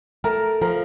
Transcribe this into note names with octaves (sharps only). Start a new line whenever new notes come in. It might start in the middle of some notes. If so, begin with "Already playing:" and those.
A3 A#4
F3 A#4